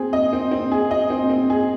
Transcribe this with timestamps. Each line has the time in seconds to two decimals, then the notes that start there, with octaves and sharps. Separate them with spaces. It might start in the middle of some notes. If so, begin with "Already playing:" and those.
Already playing: C4 G#4
0.13 D#5
0.33 C4
0.51 C4
0.72 G#4
0.91 D#5
1.10 C4
1.30 C4
1.50 G#4